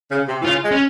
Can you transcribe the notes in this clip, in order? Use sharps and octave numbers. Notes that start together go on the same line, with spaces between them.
C#3
C3
E3
C#3 F4
G#3
C#4